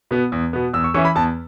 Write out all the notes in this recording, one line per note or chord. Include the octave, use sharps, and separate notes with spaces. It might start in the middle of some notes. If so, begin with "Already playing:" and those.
B2 B3
E2
B2 B3
E2 E6
C#6
E3 C#4 E4 C#6
B5
E2 A5